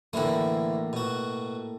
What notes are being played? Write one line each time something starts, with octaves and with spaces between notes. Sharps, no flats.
A2 D3 E3 A3 A#3
B2 F#4